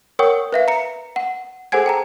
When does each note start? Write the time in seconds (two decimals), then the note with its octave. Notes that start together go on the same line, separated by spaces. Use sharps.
0.19 A#4 C#5 F#5 G5 C#6 D#6
0.53 B4 E5 F5
0.68 A#5 C#7
1.16 F#5
1.72 G#4 A4 C5 F#5 G#5 G#6
1.86 G5 A5 A#5